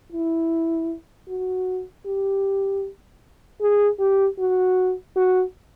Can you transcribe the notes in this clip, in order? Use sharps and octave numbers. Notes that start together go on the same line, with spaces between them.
E4
F#4
G4
G#4
G4
F#4
F#4